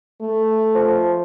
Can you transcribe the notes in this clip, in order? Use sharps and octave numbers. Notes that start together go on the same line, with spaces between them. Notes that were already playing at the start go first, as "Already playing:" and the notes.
A3
F3